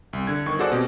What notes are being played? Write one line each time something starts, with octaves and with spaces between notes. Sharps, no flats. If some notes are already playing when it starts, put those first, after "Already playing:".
C2
D3 G#6
G1 D#3 C#6
F#4 G#4 A4 C5 D5 F#5
B2 C4 G4